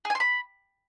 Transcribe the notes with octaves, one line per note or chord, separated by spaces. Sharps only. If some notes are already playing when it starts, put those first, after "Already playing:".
G#4
G#5
C6
B5